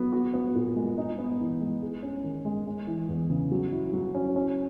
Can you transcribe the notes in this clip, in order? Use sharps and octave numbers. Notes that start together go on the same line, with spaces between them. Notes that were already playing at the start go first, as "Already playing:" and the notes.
Already playing: F#3 B3
F#4
B3
A#2
G#3
D#4
B3
E3
G#3
G#4
C#4
D#3
G#3
G#3
E3
E2
C#3
F#3
E4
F#3
C#4
C#4